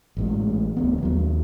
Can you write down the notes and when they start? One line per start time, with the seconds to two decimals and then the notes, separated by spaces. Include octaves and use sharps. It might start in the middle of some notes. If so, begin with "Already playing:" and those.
0.17 A1 A2 G#3
0.76 D1 D2 B3
1.03 D#2 F#3